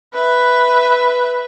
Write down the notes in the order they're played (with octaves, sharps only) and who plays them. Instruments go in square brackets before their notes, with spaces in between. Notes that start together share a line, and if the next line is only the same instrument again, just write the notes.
[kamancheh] B4 E5